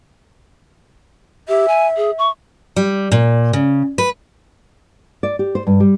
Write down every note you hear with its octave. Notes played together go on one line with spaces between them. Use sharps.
G4 E5
G#5
G#4
C#6
G3
A#2
C#3
B4
D5
G4
C5
G2
G3